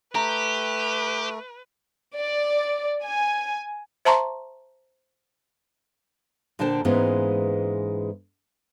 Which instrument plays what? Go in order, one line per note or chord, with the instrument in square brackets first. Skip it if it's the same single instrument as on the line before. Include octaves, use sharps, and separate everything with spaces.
[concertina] A3 [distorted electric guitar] G4 [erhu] B4 [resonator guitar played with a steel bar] A#5
[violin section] D5
G#5
[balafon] C5 E5 A5 A#5 C6 C#6
[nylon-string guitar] A#2 D3 D4 C5 G5 A5
G#2 E3 G#3 A#3 B3 C#4